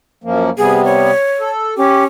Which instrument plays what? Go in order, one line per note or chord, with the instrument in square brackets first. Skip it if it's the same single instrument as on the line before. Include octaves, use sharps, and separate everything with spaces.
[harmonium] F#2 F3 A#3
[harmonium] C3 G3 B3 [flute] G#4
[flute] C#5
[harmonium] A4
[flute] C#4 [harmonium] G4